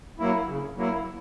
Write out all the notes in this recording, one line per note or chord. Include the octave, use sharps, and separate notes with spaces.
F#3 A#3 E4
C#3
F#3 A#3 E4